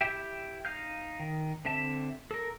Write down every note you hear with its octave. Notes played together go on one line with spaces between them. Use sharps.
E4 G4 E5 G5
D#4 F5 F6 G6
D#3
D3 C4 E5 A5
A4 A#4